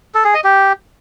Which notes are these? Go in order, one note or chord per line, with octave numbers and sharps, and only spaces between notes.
A4
G#4
D#5
G4